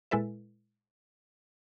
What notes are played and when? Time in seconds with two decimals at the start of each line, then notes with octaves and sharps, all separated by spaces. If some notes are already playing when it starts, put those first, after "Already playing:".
0.11 A#2 G#3 E4 A4 B4 E5